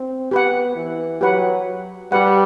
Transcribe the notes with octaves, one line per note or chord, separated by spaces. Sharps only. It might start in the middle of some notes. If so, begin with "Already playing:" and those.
Already playing: C4
B3 G4 B4 F#5
E3
F#3 G4 B4 F#5
G3 G4 B4 F#5